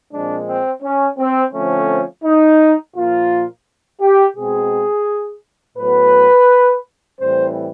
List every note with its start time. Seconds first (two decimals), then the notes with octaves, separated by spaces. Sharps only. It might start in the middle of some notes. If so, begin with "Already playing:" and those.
0.12 A#2 F3 G#3 C4 D4
0.47 C4
0.83 C#4
1.19 C4
1.53 D3 F3 A3 C4 C#4
2.24 D#4
2.95 A#2 F3 A#3 F4
4.01 G4
4.36 B2 G#3 C4 G#4
5.78 A2 F#3 B3 B4
7.19 A2 E3 G3 C4 C5